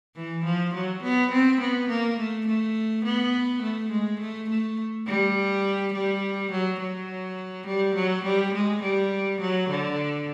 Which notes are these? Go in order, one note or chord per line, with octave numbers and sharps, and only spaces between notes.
E3
F3
F#3
B3
C4
B3
A#3
A3
A3
B3
A3
G#3
A3
A3
G3
G3
F#3
F#3
G3
F#3
G3
G#3
G3
F#3
D3